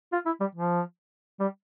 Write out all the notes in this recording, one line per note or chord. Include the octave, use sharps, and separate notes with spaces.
F4
E4
G3
F3
G3